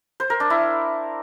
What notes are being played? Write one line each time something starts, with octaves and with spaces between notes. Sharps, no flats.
C5
A#4
D4
E4